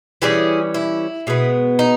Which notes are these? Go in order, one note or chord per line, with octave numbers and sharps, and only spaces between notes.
E3 G3 C#4 E4 G#4
E4
B2 G#3 B3
D#4